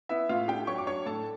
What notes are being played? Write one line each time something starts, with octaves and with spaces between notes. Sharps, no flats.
B3 E4 E5
A2 F4 F5
D4 G4 G5
F#3 C#5 C#6
D6
D4 C#5 C#6
A2 A4 A5